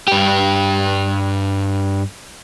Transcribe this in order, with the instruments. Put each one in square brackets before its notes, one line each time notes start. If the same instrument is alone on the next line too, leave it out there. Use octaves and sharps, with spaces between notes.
[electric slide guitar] G2 G4